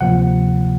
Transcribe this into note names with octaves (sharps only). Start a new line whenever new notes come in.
D2 C3 F3 A#3 F#5